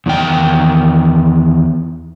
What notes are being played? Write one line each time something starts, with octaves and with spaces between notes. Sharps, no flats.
E2 D#3 G5